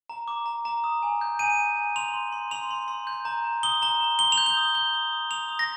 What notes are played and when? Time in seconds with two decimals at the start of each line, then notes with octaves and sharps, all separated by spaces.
0.10 A#5
0.28 D6
0.46 A#5
0.65 A#5
0.84 D#6
1.03 G#5
1.21 G6
1.39 G#5 D#7
1.58 G#5
1.77 G#5
1.96 C6 F7
2.14 C6
2.32 C6
2.51 C6 F7
2.71 C6
2.88 C6
3.07 G6
3.25 A#5
3.45 A#5
3.63 D#6 G7
3.82 A#5 G7
4.01 A#5
4.19 C6 G7
4.32 F7
4.37 G6
4.46 G7
4.57 D#6
4.75 G6 G7
4.94 D#6
5.13 D#6
5.31 D#6 F7
5.49 D#6
5.59 A#6